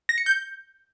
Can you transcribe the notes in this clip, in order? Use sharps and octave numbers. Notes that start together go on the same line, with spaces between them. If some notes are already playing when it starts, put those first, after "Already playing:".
A#6
C#7
G6